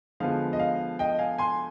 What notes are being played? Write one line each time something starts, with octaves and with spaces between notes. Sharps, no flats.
D3 F3 G#3 B3 F5
D#5
F5
D#5 G5
F5 G#5
G#5 C6